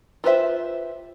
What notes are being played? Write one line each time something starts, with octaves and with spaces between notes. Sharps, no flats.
F4 G4 B4 C5 E5